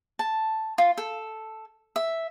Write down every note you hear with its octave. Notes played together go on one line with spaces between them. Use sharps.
A5
F4
A4
E5